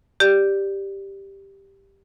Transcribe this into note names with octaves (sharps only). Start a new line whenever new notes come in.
G4 D5